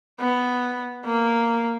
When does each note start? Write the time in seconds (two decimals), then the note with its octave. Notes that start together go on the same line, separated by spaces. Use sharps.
0.20 B3
1.05 A#3